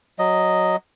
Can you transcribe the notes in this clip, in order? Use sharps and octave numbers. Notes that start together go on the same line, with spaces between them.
F#3 D#5